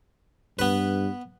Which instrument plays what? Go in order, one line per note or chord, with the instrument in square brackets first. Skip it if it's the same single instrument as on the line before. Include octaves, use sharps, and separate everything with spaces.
[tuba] G2 [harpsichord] B3 B4